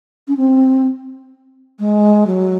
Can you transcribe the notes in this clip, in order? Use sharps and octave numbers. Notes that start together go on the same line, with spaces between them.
C#4
C4
G#3
F#3